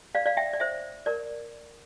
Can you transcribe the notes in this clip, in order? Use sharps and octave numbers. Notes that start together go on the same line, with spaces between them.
D5 F5
D5 F5
E5 G5
D5
C5 E5
A#4 D5